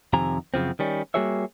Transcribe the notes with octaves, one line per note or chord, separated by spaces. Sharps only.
F2 C3 D#3 G#5 A#5
F#2 C#3 F3 C4
D#3 G3 C#4
G3 A#3 F#4 G#4 C#5 E5